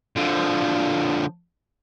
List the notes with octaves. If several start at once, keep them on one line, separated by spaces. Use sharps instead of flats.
D3 F3